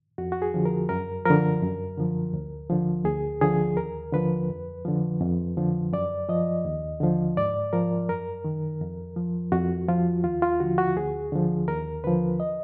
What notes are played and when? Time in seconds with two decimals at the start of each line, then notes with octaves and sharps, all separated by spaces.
0.18 F2 F#4
0.32 F#4
0.42 G#4
0.54 D3 F3
0.65 A#4
0.89 F#2 A#4
1.25 D3 F3 A#4
1.62 F#2
1.98 D3 F3
2.33 D2
2.70 D3 F3
3.05 D2 G#4
3.41 D3 F3 G#4
3.77 D#2 A#4
4.13 D3 F3 B4
4.50 F2
4.85 D3 F3
5.21 F2
5.57 D3 F3
5.93 F#2 D5
6.29 F3 D#5
6.65 D#2
7.00 D3 F3
7.37 G#2 D5
7.73 F3 A#4
8.09 F#2 A#4
8.45 D#3
8.81 F2
9.16 F3
9.52 F2 F#4
9.89 F3 F4
10.24 D#2 F4
10.42 F4
10.60 D3 F3 F#4
10.78 F#4
10.96 D2 G#4
11.32 D3 F3
11.68 D#2 A#4
12.04 D3 F3 B4
12.40 D#5